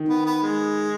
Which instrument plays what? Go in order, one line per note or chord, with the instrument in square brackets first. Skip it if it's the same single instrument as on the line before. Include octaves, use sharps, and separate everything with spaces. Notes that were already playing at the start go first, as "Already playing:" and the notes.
Already playing: [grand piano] D#3
[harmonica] B3
B3
G#3